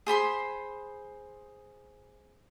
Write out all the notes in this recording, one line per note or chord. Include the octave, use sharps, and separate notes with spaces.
G#4 C5 B5 C6